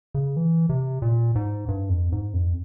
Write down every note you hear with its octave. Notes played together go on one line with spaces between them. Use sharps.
C#3
E3
C3
A#2
G#2
G2
F2
G#2
F2